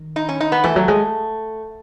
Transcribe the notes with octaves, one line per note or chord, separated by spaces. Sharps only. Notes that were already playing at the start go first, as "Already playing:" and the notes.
Already playing: D#3
D#4
C#4
D#4
B3
E3 A3
F#3
G#3